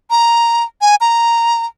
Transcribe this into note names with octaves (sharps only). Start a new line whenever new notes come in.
A#5
G#5
A#5